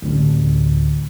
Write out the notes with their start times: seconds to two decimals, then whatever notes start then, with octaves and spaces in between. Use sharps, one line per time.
0.02 A1 D2